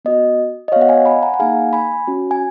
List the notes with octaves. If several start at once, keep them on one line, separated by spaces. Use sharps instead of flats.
B3 F#4 D#5
D#5
B3 F#4 C#5 F5
D#5 F#5
F5 G#5
G#5 B5
F#5 A#5
F#5
A#3 D#4 G#4 F5 G#5
G#5 B5
C#4 F#4
G#5